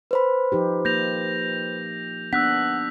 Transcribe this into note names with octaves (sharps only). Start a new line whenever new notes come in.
B4 C5 B5
F3 D#4 G4
A#3 G6 A#6 F7
B3 D4 F#5 E6 F#6 B6